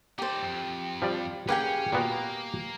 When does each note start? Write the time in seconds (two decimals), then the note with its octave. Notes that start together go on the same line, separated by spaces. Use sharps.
0.18 D#4 G4 C5 D5
0.41 F2
1.02 F3 G3 D5
1.49 A#3 C#4 G4 G#4 B4 G5
1.93 A#2 A#3 B3 F#4